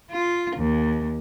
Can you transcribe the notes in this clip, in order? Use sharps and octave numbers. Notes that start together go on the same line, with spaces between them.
F4
D#2